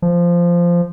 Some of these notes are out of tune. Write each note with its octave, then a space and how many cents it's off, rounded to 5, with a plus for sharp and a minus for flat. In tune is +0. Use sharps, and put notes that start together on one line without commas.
F3 -10